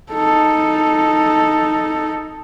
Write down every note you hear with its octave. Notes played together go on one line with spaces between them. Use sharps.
D#4 A4